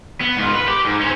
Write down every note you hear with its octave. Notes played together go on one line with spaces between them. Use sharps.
B3
G#2 F4
B4
G4
G#2
C#4 C5